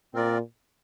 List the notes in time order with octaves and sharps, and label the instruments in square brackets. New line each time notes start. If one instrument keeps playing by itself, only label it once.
[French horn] A#2 [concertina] C4 F4 A#4 D5